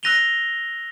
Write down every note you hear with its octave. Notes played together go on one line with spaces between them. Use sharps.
E6 F#6 A#6 D#7 F7 G7